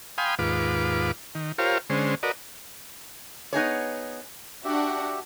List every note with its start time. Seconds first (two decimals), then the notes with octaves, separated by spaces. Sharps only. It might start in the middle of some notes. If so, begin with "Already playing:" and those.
0.18 F5 G5 G#5 B5 C6 D#6
0.39 D#2 G#2 F4 B4 D6
1.35 D#3
1.58 F4 G4 A#4 C5 C#5 F5
1.90 D3 G#3 C#4 C5
2.23 F#4 A#4 B4 D5 D#5
3.53 B3 D#4 G#4 C#5
4.64 D4 F#4 G4 E5 F#5